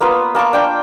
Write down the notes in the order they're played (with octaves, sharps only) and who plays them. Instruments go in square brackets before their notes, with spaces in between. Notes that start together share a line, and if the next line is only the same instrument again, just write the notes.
[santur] A#3 B3 F4 B4
A#3 A5 C#6 D6
D4 G5 D6